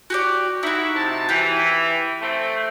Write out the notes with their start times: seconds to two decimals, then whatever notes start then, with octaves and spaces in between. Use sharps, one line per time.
0.10 F#4 G4 D5
0.63 D#4 E4 F#4
0.95 C3 A5
1.29 E3 E4 G4
2.21 A3 C4